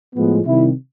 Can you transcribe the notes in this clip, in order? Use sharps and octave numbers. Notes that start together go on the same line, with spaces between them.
A2 F3 G#3 B3
C3 D#3 G3 E4